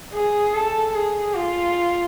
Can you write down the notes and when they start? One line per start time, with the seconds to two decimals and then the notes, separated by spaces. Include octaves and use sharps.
0.14 G#4
0.54 A4
0.95 G#4
1.35 F4